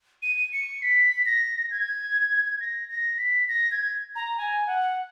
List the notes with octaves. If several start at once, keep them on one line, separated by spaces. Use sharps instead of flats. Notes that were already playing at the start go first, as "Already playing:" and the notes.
D#7
C#7
B6
A#6
G#6
A#6
A#6
B6
A#6
G#6
A#5
G#5
F#5